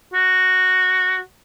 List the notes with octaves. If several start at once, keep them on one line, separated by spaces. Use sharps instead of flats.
F#4